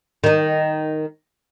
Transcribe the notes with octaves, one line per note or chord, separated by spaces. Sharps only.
D#3 D#4